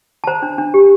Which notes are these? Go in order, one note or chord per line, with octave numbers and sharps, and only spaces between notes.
A5
C5 A#5
D4
D4
G4